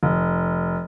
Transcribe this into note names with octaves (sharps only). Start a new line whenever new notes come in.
F1